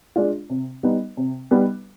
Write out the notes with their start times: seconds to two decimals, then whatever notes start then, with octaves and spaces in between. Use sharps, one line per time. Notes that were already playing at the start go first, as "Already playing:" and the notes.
0.16 G#3 D4 F4
0.50 C3
0.83 G3 B3 D#4
1.17 C3
1.51 G3 B3 D#4